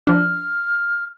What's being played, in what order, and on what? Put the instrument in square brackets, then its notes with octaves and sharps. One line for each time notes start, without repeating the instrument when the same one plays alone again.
[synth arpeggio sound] F3 D4 [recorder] F6